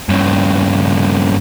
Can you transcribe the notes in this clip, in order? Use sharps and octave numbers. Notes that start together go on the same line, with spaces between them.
G2 C#3